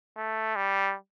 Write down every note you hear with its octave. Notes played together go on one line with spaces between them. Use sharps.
A3
G3